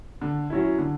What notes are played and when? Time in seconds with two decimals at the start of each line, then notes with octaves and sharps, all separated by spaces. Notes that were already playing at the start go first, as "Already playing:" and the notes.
0.21 D3
0.50 F#3 C#4 E4
0.78 D3